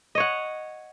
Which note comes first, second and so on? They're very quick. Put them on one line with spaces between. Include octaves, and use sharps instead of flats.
D#5 C#5 F#5